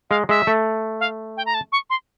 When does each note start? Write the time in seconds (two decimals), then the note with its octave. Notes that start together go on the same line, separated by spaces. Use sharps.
0.10 G#3 F5
0.29 G#3 E5
0.47 A3
1.00 F5
1.37 G5
1.46 A#5
1.54 A5
1.72 C#6
1.90 C6